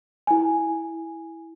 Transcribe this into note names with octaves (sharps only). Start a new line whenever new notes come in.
E4 G#5